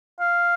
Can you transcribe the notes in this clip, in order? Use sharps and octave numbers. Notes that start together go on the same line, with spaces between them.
F5